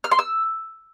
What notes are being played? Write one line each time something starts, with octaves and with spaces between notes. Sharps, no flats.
F6
C6
E6